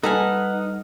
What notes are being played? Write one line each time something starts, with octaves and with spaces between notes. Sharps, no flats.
G3 D#4 A4 B4 F#5 G#5 F6